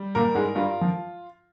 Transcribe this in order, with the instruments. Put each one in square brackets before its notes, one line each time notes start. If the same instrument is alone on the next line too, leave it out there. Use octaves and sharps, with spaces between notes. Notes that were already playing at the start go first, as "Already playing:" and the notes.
Already playing: [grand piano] G3
[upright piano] A#2 A#3 [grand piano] A#4
[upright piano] G#2 G#3
[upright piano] G2 G3 [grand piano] F4
[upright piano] F3